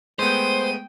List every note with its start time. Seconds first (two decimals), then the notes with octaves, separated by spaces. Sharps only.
0.19 G#3 A3 B3 C5 G5 D#7